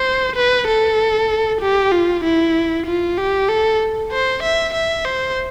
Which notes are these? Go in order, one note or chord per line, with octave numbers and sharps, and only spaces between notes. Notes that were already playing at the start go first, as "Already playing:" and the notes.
Already playing: C5
B4
A4
G4
F4
E4
F4
G4
A4
C5
E5
E5
C5